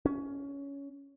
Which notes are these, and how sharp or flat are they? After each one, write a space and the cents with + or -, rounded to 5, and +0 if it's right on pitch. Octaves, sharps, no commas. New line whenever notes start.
C#4 +15